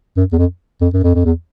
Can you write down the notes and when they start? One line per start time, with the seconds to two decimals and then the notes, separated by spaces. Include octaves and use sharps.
0.17 F#2
0.33 E2
0.38 F2
0.81 F2
0.94 F#2
1.03 F2
1.15 F2
1.25 E2